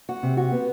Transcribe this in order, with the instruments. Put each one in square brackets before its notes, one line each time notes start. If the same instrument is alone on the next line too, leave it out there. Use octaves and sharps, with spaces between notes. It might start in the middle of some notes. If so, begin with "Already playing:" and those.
[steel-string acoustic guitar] F#4
C3
F#4
B3